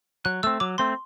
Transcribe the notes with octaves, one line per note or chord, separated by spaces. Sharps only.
F#3 F#6
A3 C4 E6
F#3 D6
A3 C4 C6